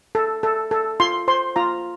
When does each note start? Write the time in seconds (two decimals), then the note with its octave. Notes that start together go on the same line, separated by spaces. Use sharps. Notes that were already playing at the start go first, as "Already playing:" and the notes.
0.15 A4
0.43 A4
0.71 A4
1.00 F4 C6
1.28 C5 C6
1.56 F4 A#5